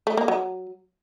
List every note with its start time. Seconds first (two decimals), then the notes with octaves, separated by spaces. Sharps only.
0.07 A3
0.17 A#3
0.28 F#3